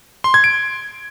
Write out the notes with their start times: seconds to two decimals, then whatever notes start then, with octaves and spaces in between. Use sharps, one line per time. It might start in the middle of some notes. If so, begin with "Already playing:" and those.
0.24 C6
0.34 G#6
0.44 D7